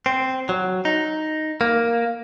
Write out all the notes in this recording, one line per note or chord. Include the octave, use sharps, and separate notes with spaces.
C4
F#3
D#4
A#3